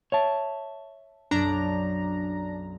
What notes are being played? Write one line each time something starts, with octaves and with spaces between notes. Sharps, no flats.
C#5 E5 A5
B1 F#2 D4 A#5